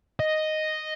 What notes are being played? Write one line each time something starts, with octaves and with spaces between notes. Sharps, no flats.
D#5